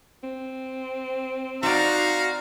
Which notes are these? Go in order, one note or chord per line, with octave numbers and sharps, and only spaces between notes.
C4
C4 D#4 F#4 D5 F5 A#5